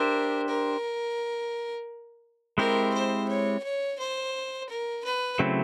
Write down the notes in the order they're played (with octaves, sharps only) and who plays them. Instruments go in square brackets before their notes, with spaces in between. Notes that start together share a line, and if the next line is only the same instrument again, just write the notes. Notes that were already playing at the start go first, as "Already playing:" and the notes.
Already playing: [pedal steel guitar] D4 G4 C5 E5 [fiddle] A#4
[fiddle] A#4
[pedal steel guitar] G#3 C4 E4 G4 [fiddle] A#4
[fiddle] C5
C#5
C#5
C5
A#4
B4
[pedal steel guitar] C#3 F#3 A3 C4 E4